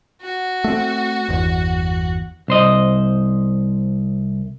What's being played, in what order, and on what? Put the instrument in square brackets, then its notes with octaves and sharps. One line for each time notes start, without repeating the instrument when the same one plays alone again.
[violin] F#4
[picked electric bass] A3 C4
G1 E2
[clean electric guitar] C2 C5 D#5